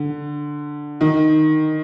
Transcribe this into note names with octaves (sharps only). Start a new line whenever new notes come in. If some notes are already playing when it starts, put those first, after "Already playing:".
Already playing: D3
D#3